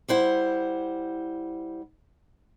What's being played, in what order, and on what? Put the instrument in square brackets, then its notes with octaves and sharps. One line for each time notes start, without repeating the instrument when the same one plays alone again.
[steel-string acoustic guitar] G3 E4 C5 F#5